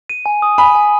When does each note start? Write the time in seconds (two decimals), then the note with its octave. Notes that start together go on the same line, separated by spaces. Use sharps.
0.10 D#7
0.26 G#5
0.42 D#6
0.58 G#5 B5
0.75 G#5